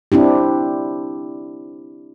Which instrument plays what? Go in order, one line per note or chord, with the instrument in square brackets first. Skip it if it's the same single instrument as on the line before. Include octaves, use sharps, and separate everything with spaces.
[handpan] C4 D4 E4 G4